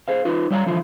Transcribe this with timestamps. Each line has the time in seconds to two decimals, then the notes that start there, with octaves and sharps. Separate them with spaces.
0.08 G#4 C5 F5
0.25 D#4 F4 B4
0.50 G3 C#5 D5 F5 G5 A#5
0.66 D3 E3 F3 E4 F4